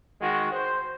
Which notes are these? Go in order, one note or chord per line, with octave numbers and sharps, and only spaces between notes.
D#3 G#3 F#4
C5